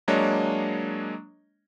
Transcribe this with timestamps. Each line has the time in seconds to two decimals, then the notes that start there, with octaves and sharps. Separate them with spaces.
0.08 F#3 G#3 A#3 D4 C#5 D#5